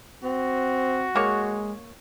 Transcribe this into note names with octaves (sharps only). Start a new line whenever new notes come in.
C4 F#4
G#3 A#3 C#5